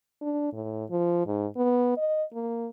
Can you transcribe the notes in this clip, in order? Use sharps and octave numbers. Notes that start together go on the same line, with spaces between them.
D4
A2
F3
G#2
B3
D#5
A#3